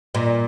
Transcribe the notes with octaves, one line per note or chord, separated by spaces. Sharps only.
A#2